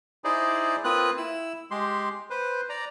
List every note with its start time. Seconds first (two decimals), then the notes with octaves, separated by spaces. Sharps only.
0.24 D#4 E4 G#4 C5 D5
0.84 A#3 C4 F4 B4 D#6 F#6
1.18 E4 E6
1.71 G#3 G4 C6
2.30 B4 C5
2.69 D5 A#5